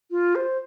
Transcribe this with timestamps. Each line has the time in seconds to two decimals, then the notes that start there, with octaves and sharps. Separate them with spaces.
0.11 F4
0.35 C5